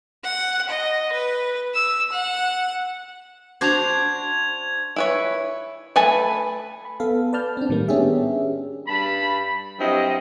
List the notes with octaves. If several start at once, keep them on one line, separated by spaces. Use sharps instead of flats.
F#5
D#5
B4
E6
F#5
D4 F#4 C5 G#6 F7
E4 B4 C#5
A3 B4 G#5 A5
B5
B3 A4 F5
B4 D5 A5 F6 G6
C4 D4
A2 D#3 G3 A#3
B3 C#4 D4 G4 G#4 E5
G2 A5 B5
G2 F#3 C4 E4 D#5